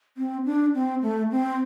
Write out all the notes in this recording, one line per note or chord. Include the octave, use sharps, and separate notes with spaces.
C4
D4
C4
A3
C4